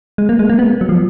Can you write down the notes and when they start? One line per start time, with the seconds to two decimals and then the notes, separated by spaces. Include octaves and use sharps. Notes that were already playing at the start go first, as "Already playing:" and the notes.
0.18 G#3
0.29 A#3
0.39 G#3
0.50 A#3
0.59 B3
0.81 F#3
0.89 F3